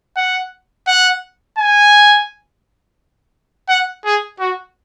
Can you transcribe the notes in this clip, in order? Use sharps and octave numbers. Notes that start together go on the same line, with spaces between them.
F#5
F#5
G#5
F#5
G#4
F#4